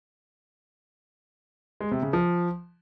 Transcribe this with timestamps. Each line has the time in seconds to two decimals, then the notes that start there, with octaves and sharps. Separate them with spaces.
1.81 G#3
1.91 C3
2.02 C#3
2.13 F3